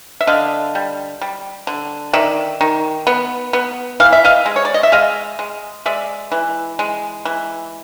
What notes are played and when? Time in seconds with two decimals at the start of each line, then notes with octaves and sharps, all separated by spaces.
0.21 E5
0.27 D3 D#5 F5
0.75 G3
1.21 G3
1.67 D3
2.13 D#3 D5 E5
2.61 D#3
3.07 B3
3.53 B3
4.00 E3 F5
4.13 E5
4.25 D#5 F5
4.46 G#3
4.56 C#5
4.65 D5
4.74 D#5
4.83 E5
4.92 G#3 D#5 F5
5.39 G#3
5.86 G#3 D5 E5
6.32 E3
6.79 G#3
7.25 E3